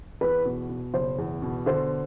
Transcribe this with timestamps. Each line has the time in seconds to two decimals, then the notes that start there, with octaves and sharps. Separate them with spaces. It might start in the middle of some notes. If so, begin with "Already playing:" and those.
0.21 E2 B4
0.45 B2
0.70 B2
0.94 F#1 C5
1.18 E2
1.42 B2
1.66 D3 C5